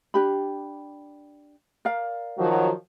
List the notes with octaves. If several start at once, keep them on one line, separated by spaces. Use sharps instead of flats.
D4 G4 B5
A#4 D5 F5
D#3 F3 F#3